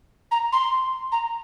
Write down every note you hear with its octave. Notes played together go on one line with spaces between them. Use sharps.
A#5
C6
A#5